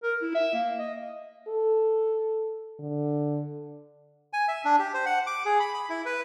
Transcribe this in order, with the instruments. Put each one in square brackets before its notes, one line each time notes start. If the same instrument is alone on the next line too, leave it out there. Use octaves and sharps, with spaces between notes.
[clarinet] A#4
E4
E5
A#3
D#5
[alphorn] A4
D3
[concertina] G#5
E5
D4
G4
C5
F#5
D6
G#4
B5
B5
E4
B4